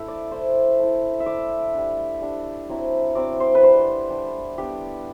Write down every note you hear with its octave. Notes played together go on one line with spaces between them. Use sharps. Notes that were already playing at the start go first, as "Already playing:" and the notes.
Already playing: A3 D4 E4 E5
D5
A3 E4 C5
A3 E4
E5
A3 E4 D5
G3 D4
G3 D4
F#3 C4 E4
F#3 C4 E4 D5
C5
B4
G3 D4 C5
G3 D4
G3 B3 D4 G4